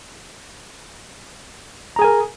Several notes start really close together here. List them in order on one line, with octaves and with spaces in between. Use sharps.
A#5 G#4 G#5 A#4